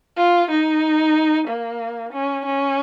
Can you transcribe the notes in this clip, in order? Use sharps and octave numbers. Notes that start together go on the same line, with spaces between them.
F4
D#4
A#3
C#4
C#4